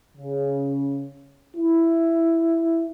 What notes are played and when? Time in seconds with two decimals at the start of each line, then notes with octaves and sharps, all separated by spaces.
0.17 C#3
1.57 E4